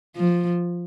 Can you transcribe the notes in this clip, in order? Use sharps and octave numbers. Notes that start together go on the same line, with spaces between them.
F3